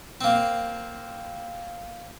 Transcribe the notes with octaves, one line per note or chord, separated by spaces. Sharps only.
A#3 C4